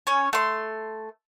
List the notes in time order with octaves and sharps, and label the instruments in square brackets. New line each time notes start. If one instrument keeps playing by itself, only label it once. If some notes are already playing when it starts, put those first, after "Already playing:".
[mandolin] C#4 C#5
A3 C6